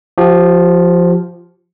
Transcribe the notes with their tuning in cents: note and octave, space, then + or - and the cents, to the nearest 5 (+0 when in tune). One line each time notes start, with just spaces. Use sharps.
F3 +0 G4 -30